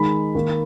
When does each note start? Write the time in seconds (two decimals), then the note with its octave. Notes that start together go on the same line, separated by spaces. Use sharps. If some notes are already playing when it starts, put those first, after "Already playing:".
Already playing: D#3 G#3 D#4 B5
0.35 D#3 A#3 D#4